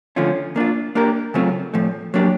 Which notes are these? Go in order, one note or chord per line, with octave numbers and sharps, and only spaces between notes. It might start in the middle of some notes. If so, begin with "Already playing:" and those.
D3 F3 A3 C#4 F4
A#3 D4 F4
A#3 D4 G4 A#4
C#3 F#3 A3 C4 F4
A2 F3 A3
F#3 A#3 D4 G4